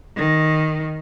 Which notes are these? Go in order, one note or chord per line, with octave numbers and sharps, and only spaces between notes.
D#3